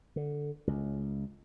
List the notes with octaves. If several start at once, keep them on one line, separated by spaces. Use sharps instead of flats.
D3
C#2